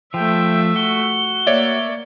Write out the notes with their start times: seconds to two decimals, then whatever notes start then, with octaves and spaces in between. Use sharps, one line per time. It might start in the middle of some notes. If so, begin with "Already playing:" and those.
0.14 F3 A3 E5 G5
0.76 F#4 G7
1.47 A#3 C#5 D5 E5